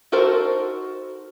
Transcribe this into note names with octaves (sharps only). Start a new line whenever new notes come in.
D#4 F#4 A4 A#4 C5